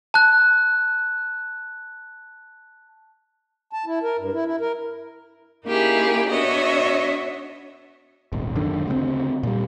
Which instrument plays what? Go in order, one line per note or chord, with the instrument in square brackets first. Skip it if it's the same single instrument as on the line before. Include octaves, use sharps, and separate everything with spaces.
[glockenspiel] A5 F#6
[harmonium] A5
E4
A#4
G2
E4
E4
A#4
[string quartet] A#3 C#4 D#4 E4 G4 G#4
B3 D4 F#4 C#5 D#5 E5
[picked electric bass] D#1 G#1
G#1 F#2 D3 D#3
D2 C#3 A3 C4
A#2 G3